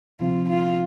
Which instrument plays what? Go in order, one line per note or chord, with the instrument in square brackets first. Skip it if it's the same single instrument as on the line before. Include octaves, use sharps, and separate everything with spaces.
[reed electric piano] D2 C3 F3 C4 [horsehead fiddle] F4
[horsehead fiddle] F4